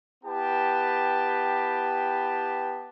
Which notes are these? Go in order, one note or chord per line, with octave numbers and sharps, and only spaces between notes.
B3 E4 G4 B4 G5 A5